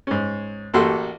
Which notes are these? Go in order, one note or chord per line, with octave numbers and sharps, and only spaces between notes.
G#2 C#4
A1 A#3 F#4 G4 A4 C6